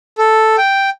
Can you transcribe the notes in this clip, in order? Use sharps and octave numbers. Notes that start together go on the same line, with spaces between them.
A4
G5